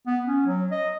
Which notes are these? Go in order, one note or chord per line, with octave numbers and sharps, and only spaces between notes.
B3
C#4
F#3
D#5